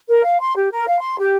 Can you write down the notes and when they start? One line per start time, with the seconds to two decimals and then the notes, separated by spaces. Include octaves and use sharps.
0.08 A#4
0.24 F5
0.40 C6
0.55 G4
0.71 A#4
0.87 F5
1.02 C6
1.18 G4